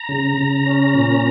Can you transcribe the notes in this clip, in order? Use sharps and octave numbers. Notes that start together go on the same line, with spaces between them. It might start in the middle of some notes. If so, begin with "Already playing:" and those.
Already playing: A#5
C#3
C#3
C#4
A#2